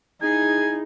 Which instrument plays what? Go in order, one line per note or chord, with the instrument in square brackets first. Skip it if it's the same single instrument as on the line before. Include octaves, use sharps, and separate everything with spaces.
[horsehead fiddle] D#4 E4 [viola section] G#4 [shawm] G#5